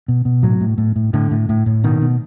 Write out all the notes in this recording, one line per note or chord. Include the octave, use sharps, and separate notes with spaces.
B2
B2
A2 F#3
A2
A2
A2
A2 D3
A2
A2
A2
B2 D#3
B2